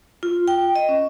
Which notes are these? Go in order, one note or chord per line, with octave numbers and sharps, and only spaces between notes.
F4
G5
D#5
C#4